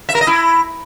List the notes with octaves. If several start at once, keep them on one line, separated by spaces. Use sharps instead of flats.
E5
A#4
D#5
E4